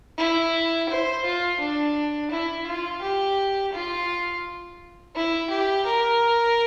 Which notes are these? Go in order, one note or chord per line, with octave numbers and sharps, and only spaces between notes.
E4
C5
F4
D4
E4
F4
G4
F4
E4
G4
A#4